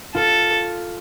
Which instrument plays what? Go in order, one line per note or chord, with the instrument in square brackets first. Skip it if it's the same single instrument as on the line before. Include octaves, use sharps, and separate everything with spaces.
[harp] F4 [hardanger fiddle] A4